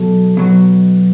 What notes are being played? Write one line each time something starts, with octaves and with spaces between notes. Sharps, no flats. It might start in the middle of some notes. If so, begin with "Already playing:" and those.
Already playing: B2 F#3 A4
B2 F#3